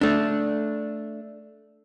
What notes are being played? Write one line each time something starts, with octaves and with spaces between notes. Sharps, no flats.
A3 D4